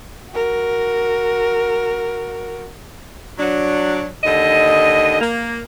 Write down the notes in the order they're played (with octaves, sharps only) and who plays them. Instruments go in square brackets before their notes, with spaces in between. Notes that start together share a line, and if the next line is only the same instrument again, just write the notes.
[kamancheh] F#4 A#4
[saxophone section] F#3 D4
D#2 D3 D#5
A#3